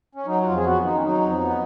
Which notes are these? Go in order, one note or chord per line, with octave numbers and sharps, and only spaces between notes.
C#4
F#3 D#4
F#4
F2 F4
G#4
B3 F#4
D#3 D#4
C#4
F#3 D#4
F2
B3